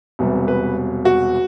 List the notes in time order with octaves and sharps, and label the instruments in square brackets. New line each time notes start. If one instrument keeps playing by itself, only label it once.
[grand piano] E1 E2 C3 G3
B4
F#4